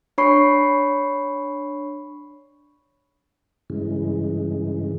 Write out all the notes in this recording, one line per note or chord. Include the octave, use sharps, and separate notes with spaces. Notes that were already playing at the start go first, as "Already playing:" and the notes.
D4 C#5 B5 C#6 C7
G2 C#3 E3 G#3